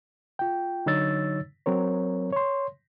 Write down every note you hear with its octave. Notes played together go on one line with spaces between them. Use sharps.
F4 G5
D3 F#3 D#4 C#5 E6 A6
F#3 C4 A#4 C#5
C#5 C6